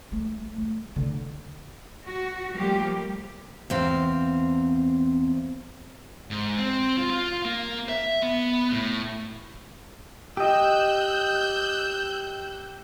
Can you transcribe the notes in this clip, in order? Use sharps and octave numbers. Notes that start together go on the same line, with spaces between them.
A3
A3
D3
F#4
F3 G3 A3 A#3 G4
E2 C4 F5
G#2
C4
F4
F4
A#3
E5
B3
A2
G4 D#5 E6 F#6 G6